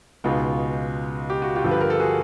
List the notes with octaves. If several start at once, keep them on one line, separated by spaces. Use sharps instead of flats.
C#2 B2 G#3 D#4 F4
G4
F#4
F4 G4
G2 D3 F3
B4
A#4
A4
F#4 G#4